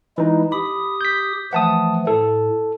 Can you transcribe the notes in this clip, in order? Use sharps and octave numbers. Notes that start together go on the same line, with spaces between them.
E3 G#3 D#4 E4
G4 B5 D#6
G6 B6
E3 F3 A3 F#5 A5 D#6
A2 A4